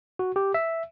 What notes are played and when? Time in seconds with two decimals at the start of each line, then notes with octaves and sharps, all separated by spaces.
0.19 F#4
0.36 G4
0.54 E5